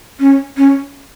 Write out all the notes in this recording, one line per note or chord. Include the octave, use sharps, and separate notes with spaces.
C#4
C#4